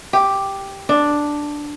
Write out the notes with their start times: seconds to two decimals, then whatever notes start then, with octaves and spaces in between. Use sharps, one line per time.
0.13 G4
0.89 D4